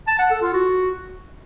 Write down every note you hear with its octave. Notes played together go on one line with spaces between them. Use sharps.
A5
F#5
A4
F4
F#4